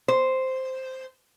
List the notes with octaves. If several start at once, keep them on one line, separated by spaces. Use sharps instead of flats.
C5